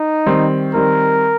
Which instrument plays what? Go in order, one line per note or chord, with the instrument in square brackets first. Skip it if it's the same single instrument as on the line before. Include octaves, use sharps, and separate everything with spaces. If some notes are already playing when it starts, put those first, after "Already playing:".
Already playing: [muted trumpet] D#4
[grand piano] D#3 G3 C4
[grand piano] D#3 G3 C4 [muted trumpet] A#4